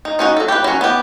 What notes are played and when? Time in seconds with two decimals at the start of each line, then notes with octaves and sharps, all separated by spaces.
0.05 D#4
0.19 C#4 D#4 F#4
0.37 F#3 A4
0.48 G4 B4
0.64 F#3 C#4
0.81 B3 G4